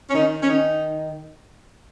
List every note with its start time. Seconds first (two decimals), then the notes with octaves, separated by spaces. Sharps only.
0.10 C#4
0.14 D#3 D#4
0.43 C#4
0.48 D#3 D#4